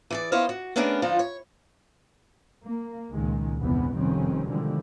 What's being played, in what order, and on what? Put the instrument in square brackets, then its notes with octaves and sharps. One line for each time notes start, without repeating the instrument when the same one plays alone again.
[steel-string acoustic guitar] E3 G#4 D5
B3 E4 C5 C#5 D#5 F5
F#4
A3 B3 C#4 D4 G#4 A#4
D3 F3 D#4 F4 C5
C#5
[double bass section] A#3
C#2 A#2 D#3 G#3
G1 E2 C3 E3 B3
F1 F2 D#3 G3 C4 C#4
B2 D3 D#3 F3 G3 G#3